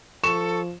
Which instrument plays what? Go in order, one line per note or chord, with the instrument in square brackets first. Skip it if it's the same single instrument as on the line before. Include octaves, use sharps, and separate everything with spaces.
[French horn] F3 [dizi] A4 [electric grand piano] C#6 [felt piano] E7